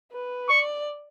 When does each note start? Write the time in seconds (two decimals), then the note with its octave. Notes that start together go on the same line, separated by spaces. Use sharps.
0.12 B4
0.49 D5 C#6